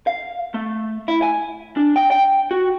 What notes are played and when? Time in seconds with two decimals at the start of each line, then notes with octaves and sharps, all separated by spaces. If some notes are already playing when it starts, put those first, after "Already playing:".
0.07 F5
0.54 A3
1.08 E4
1.22 G#5
1.77 D4
1.96 G5
2.11 G5
2.51 F#4